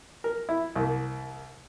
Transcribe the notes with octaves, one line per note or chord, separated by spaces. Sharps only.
A#4
E4
C2 A#3